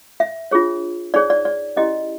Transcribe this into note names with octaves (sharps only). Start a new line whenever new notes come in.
E5
D4 F4 G#4 C#5
D#4 G#4 C#5 D5
D5
D5
C#4 E4 G4 D#5